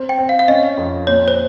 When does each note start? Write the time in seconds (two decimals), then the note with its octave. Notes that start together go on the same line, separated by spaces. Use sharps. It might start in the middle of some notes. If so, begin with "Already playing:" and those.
Already playing: C4
0.09 G5
0.18 C4
0.29 F5
0.39 F5
0.48 C#4 D#5
0.77 F2
1.07 A#2 C#5
1.28 C5